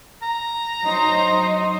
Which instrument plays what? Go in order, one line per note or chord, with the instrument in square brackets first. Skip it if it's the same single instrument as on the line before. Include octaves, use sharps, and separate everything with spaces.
[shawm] A#5
[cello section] F#3 D#4 C5